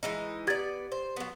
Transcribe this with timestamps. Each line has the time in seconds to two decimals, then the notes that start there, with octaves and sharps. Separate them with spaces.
0.03 E3 G#3 D#4
0.47 B3 G4 D5 G#6 A6
0.92 C5
1.16 F#3 B3